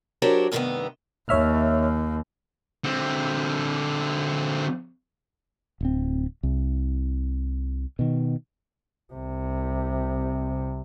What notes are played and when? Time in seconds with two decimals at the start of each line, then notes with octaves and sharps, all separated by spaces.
0.22 F#3 D4 G4 A#4 C5 C#5
0.52 G2 C3 D#3 G3 A3 B3
1.29 D#2 C#5 E5 F6
2.84 D3 C4
5.81 D1 C4
6.43 C2
7.99 B2 D#3
9.14 C2 C3